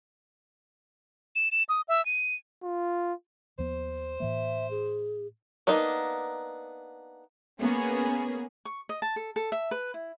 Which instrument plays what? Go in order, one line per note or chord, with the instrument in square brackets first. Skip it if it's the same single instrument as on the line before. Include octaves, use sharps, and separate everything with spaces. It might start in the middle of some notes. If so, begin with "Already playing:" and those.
[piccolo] E7
E7
D#6
E5
D#7
[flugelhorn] F4
[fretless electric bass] D#2 F3 B3 [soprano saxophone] C5
[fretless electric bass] A2 E3 A#3 [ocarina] E5
[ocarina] G#4
[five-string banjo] A#3 B3 D4 D#4
[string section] A#3 B3 C#4 G#4
[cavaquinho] C#6
D#5
A5
A4
A4
E5
B4
E4